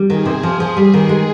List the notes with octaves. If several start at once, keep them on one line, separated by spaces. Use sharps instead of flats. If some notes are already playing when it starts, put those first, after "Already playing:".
Already playing: G3
D#3 G#4
C3
F3
F3
G3
D#3
G#3